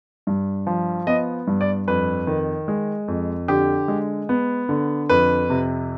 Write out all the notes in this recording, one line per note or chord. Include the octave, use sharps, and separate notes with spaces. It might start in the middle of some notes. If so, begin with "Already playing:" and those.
G2
F3
B3 D#5
G2
D5
F2 B4
D#3
G#3
F2
D3 G4
G#3
B3
D3
F2 B4
C3